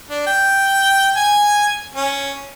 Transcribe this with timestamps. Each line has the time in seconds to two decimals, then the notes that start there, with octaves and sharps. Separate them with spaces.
0.10 D4
0.27 G5
1.16 G#5
1.95 C#4